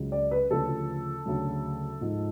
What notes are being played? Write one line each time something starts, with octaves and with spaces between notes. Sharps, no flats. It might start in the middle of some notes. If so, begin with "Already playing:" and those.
Already playing: C#2 C#3 F#3
D5
B4
D2 C#3 F3 A4
D2 C#3 F#3
G#2 F3